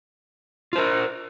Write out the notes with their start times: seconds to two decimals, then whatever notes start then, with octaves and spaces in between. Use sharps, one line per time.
0.73 F4
0.75 C5
0.78 A#4